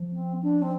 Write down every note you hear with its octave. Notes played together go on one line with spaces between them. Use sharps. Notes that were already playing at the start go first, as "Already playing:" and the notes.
Already playing: F3
C4
D4
C4